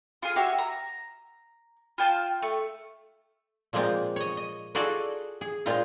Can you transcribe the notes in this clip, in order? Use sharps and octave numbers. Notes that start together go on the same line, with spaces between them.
F4 G#4
F#4 G4 C#5 E5
A#5
F4 G5 A5
A3
A#2 F3 G#3 A#3 C4 F4
C#5 D#5
D#5
D#4 F4 F#4 G#4 A4 D5
G#4
A#2 G#3 C4 F4 F5